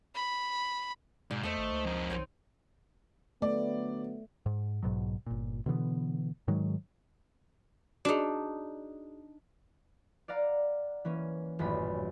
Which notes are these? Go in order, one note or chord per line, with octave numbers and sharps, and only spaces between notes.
B5
G#2 B2 D5
E2 A3 D#4 C5 D#5
G#1
C#2
F2 A#4
B1 C4 D#4 C#5
D3 F#3 A3 B3 D5
G#2
B1 G#2 B2 F#3
G1 A#2
B2 D3 E3 B3
G#2 D#3 F#3 G#3
D4 D#4 F#4 G#4
D5 F5 F#5 A#5
E3 A#3 C#4
D#1 A1 F#2 B5